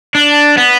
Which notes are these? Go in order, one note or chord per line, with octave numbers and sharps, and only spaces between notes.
D4
B3